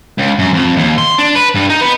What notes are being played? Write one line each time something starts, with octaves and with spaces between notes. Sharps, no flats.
C#2
F#2
F2
D#2
C6
D4
B4
G2
D#4
B3